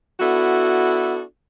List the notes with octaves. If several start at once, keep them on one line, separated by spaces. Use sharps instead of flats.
B3 D4 E4 F#4 A4